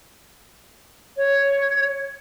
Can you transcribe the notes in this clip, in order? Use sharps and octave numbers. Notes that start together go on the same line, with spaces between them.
C#5